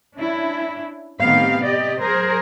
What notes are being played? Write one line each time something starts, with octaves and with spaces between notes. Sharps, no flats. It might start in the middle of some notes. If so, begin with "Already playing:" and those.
C#4 D4 E4
A2 D#3 B3 C4 G4 F5
C3 G4 D5 D#5
F#3 G#4 A#4 C5